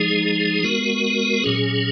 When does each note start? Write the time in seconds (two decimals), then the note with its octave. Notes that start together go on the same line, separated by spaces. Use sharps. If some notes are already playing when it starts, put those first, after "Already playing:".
Already playing: F3 G#3 D#4 G#4
0.63 G#3 B3 F#4 A#4
1.44 A#2 F#3 C#4 G#4